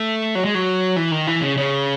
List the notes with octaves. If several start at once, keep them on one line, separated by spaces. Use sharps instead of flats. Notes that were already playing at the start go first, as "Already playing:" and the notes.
Already playing: A3
F#3
G#3
F#3
E3
D#3
E3
C#3
C#3